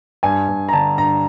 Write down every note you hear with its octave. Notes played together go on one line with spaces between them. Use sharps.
G2 G#5
G2
A#5
D3 A5
G2 A#5